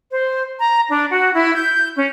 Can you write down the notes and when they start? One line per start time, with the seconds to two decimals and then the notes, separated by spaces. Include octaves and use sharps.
0.10 C5
0.58 A#5
0.88 D4
1.10 F#4
1.33 E4
1.54 G6
1.94 C#4